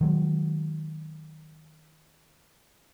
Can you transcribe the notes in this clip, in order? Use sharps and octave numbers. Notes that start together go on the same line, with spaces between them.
D#3 F#3 G#3